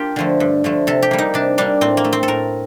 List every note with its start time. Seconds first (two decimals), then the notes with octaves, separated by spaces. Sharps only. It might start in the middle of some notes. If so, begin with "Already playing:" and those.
Already playing: A#3 D4 F4 G4
0.16 D3 F3 A3
0.40 G2
0.64 D3 F3 A3
0.87 C3 A4
1.02 G4
1.11 G3 A#3
1.18 D#4
1.34 C3 D4
1.58 G3 A#3 D4
1.81 A2 C4
1.97 A#3
2.04 A3
2.13 C4
2.23 A4
2.28 A2 A#4